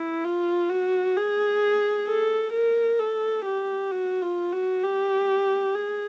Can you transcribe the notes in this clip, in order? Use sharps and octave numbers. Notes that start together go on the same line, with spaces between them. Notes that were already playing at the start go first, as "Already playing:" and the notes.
Already playing: E4
F4
F#4
G#4
A4
A#4
A4
G4
F#4
F4
F#4
G4
G#4